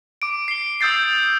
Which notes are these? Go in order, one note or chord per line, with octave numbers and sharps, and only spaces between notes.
D6 D7
C7 G7
D#6 E6 G6 A6 C7